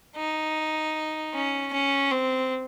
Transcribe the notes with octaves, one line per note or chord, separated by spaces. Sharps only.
D#4
C#4
C#4
C4